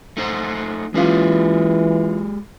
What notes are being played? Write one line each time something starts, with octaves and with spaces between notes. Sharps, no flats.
A3 D#4 C5
E3 G#3 C#4 F4 G4 G#4